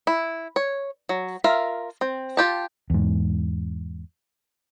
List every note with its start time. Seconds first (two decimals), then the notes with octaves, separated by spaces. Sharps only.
0.07 E4
0.56 C#5
1.09 F#3
1.44 F4 A#4 E5 F5
2.01 C4
2.37 F4 G4 A5
2.90 E2 G#2